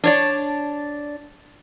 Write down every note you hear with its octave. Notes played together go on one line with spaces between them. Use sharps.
D4 C#5 D5